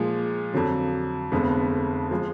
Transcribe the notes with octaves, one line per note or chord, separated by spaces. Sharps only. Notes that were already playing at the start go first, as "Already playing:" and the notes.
Already playing: A#2 F3 G#3
F2 D3 F#3
F1 F2 D3 G#3 B3
F3 G#3